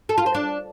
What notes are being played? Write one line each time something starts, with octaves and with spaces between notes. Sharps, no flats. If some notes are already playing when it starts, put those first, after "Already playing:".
A4
F4
C5
D4